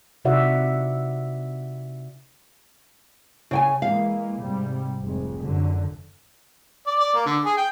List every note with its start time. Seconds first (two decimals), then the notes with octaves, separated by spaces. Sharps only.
0.25 C3 D#4 F#4 D5 E5 F#5
3.51 C#3 G5 G#5
3.82 E3 G#3 A#3 F5
4.41 G#2 C3 G3
5.02 F1 G#3
5.44 F#2 D3
6.87 D5
6.99 D5
7.14 A#3
7.26 D3
7.45 G#4
7.57 G5